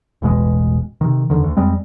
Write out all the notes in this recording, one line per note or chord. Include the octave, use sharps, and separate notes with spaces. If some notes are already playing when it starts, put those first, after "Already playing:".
E1 A1 B2 G#3
C3 D#3
E2 B2 D3 D#3
D2
F2 G3 G#3 C4